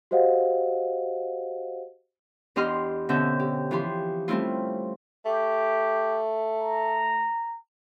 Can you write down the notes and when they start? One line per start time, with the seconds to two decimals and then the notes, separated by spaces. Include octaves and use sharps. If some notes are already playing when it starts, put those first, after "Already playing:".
0.11 F#4 G4 C5 D#5 F5 F#5
2.56 E2 D4 G4 D#5 C6 F6
3.09 B2 D3 C4 C#4 E5 G6
3.40 G4
3.71 E3 F3 G4 C6
4.28 G3 A3 C4 C#4 E4 F4
5.26 A3 G4
6.61 A#5